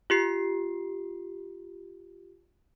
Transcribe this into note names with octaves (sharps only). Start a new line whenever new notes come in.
F4 G4 C7